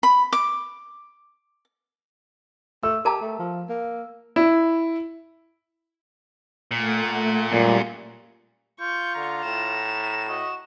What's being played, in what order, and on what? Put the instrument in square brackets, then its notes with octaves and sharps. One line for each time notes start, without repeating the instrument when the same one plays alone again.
[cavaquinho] B5
D6
[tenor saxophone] A3 [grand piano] E6
[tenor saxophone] G4 [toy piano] A#4 A5 A#5
[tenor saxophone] A3
F3
A#3
[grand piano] E4
[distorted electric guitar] A#2 [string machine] A3 F#5
[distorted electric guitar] F#2 [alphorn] A#2 [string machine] G3
[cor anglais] F4 [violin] C#6 [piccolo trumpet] G6
[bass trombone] D3 [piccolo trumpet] A#5
[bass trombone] A2 [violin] E7
[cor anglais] F#4 [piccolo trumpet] D#5